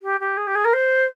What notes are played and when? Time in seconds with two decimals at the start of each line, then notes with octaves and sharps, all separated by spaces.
0.03 G4
0.20 G4
0.37 G#4
0.47 G4
0.55 G#4
0.65 A#4
0.73 C5